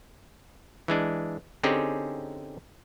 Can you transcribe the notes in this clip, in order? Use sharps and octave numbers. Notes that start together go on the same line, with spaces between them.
E3 G#3 D4
D3 C4 C#4 D#4 G4 G#4